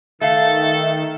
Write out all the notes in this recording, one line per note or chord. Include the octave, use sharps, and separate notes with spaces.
D#3 A3 A4 E5 F5